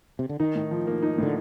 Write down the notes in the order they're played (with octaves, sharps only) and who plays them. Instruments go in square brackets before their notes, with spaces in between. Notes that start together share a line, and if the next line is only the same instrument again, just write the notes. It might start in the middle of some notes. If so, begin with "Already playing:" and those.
[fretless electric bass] C3
D3
[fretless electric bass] D#3 [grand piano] D#4
[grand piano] A2
F3
A#3
D#4
[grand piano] A2 [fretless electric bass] D3